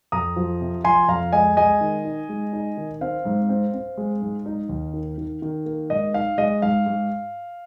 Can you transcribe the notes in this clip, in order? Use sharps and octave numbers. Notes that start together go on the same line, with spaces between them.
F2 A#5 D#6
F3
C3
F3 G#5 C6
F2 F5 A#5
G#3 D#5 G#5
G#3 D#5 G#5
D#3
D#4
G#3
D#4
D#3
C4 F5
G#2
C4
C4
G#3
G#2
D#4
D#2
D#3
D#3
D#3
A#3
G#2 D#5
D#4 F5
G#3 D#5
G#2 F5
G#2